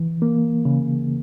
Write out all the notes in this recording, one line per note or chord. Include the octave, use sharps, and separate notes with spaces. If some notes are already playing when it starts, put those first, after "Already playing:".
Already playing: E3
A#3
C#3